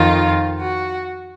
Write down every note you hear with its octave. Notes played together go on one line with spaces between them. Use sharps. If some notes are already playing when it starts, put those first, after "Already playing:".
Already playing: F2 D#3 F4
F#4